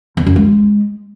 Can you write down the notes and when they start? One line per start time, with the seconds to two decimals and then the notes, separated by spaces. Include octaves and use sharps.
0.17 E2
0.26 F#2
0.36 G#3